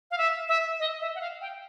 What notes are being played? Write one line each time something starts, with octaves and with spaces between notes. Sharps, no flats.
F5
E5
E5
D#5
E5
F#5
F5
G5